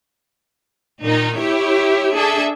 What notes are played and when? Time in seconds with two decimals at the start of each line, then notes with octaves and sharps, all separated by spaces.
1.02 A#2 D#3 D#4
1.38 E4 G4 C#5
2.14 D4 G#4 A4 E5